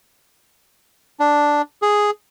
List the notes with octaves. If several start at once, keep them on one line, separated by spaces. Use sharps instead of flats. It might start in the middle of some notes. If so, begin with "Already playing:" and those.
D4
G#4